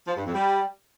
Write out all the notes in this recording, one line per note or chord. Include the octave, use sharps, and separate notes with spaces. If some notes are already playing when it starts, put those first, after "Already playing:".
F3
G2
F2
G3